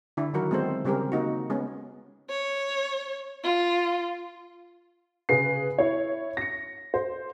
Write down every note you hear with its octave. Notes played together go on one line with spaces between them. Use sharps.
D3 D4 E4
D#3 F#3 F#4 A#4
G#3 B3 C4 A4 C5
C#3 G3 C4 G4 G#4 A#4
A#3 D#4 F#4
G#3 B3 C#4 G#4
C#5
F4
C#3 G#4 B4 C7
E4 C#5
A#6 C#7
C5